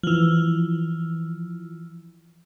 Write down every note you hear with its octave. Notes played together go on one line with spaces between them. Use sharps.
E3 F3